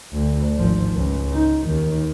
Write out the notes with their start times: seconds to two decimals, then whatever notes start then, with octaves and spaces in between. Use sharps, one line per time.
0.13 D2
0.57 G#1 F3
0.96 C#2
1.33 D#4
1.66 D#2 D#3